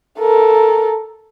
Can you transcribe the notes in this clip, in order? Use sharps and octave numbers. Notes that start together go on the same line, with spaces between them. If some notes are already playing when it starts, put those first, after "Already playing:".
A4 A#4